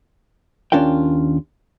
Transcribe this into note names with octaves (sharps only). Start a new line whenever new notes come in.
D#2 C#4 D4 F4 A#4 G5